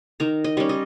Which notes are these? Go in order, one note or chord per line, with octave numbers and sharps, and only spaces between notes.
D#3 A#5
D#5
G3 C#4
D#5